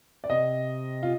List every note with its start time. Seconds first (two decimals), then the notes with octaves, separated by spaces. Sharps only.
0.24 D5
0.30 C3 D#5
1.03 F4